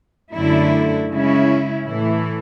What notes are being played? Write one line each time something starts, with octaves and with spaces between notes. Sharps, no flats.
F#2 D3 A3 E4
C#3 G#3 C#4 E4
A2 E3 A3 E4